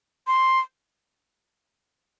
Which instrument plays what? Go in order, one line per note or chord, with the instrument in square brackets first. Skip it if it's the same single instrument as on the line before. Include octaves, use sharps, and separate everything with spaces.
[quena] C6